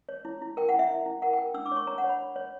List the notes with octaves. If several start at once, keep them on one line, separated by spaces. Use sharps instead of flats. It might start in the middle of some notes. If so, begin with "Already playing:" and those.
C#5
E4
E4
A#4 G5
F#5
E4
E5
E4
E4
A#4 F#5
G5
A#4
D4 E6
D6
C#5 C#6
C#5 A#5
F#5
C#5
B5
C#5
C#5